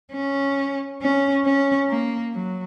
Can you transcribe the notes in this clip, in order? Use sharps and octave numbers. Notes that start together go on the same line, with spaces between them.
C#4
C#4
C#4
A#3
F#3